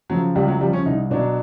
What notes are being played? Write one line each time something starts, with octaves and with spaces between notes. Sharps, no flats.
C#3 F3 F#3
C#2 G3
F#3
C#3 F3 G3
C#4
C2 D#4
B2 F#3 D4